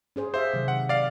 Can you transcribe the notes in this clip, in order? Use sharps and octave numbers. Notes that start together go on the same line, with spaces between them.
C#4 G#4 C5
G4 C5 E5 F5
C3 D#3 F#3
F#5
D5 F5